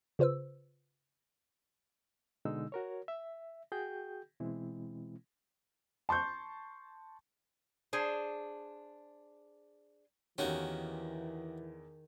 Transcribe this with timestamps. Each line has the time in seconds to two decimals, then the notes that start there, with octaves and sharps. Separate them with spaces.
0.19 C#3 F4 B4 C5 E6
2.45 B2 D3 G#3 D#4 E6
2.72 F#4 A#4 C#5
3.08 E5
3.72 F#4 G#4 G5 G6
4.40 B2 E3 G#3 C4 E4
6.09 A5 C6 C#6 G6
7.93 D4 G#4 C5
10.38 E2 D#3 E3 A#3 C#4 F#4 G4